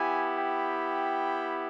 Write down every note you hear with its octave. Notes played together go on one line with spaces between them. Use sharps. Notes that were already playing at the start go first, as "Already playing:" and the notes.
Already playing: B3 E4 G4 G#5
G5